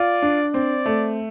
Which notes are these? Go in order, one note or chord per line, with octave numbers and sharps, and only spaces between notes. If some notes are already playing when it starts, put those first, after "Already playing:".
Already playing: F4 D5
D4
C4 D5
A3